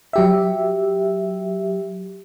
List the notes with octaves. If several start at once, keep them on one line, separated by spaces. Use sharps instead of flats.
F#3 G4 E5